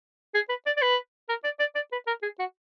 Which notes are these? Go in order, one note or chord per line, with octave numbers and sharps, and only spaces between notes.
G#4
B4
D5
D5
B4
A#4
D5
D5
D5
B4
A#4
G#4
F#4